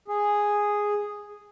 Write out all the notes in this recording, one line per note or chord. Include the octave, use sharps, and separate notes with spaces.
G#4